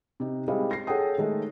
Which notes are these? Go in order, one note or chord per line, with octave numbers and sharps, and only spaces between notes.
C3 D#4
G3 G#3 C4 E4 D#5 F5
A#6 C7
G#4 A4 C#5 F#5 G5 D#6
D#3 G#3 A3